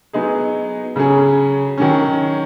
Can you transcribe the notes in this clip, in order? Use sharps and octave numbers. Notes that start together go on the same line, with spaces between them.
F#3 B3 D#4 G#4
C#3 F#3 C#4 G#4
D#3 F#3 C#4